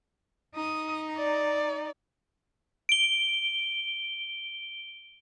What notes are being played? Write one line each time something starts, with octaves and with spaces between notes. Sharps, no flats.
D#4 D#6
D5
D7 G7